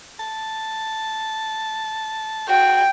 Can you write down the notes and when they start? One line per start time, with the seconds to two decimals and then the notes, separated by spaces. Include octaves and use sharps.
0.20 A5
2.49 F#4 G5